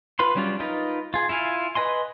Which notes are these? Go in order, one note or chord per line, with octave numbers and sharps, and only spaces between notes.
F4 B4 B5 C6
F#3 G3 C#4 D4 F4
D#4 F4 A#4 B4
F4 G#4
E4 F4 F5 G#5
B4 D#5 G#5 C6